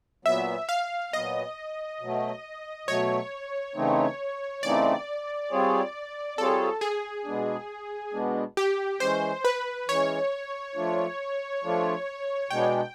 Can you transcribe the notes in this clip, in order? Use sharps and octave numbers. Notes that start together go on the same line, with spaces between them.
A#2 F#3 B3 E5
F5
A#2 F#3 B3 D#5
B2 F#3 A3
B2 F#3 A3 C#5
C#3 E3 A3 C4 D#4
C#3 E3 A3 C4 D#4 D5
G3 C4 F4 G#4 C#5
G3 C4 F4 G#4 A4 C#5
G#4
B2 G#3 B3 D4
B2 G#3 B3 D4
G4
E3 G#3 C#4 C5
B4
E3 G#3 C#4 C#5
F3 A3 D4 F4
F3 A3 D4 F4
B2 G#3 B3 D4 G5